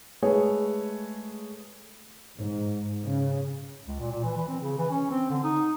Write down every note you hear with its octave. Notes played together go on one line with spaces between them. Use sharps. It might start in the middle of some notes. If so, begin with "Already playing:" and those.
G#3 A3 G#4 B4 C#5
G#2
C#3
C#2
A#2
A#2
E3
E3
C4
C#3
E3
C#4
C4
D3
D#4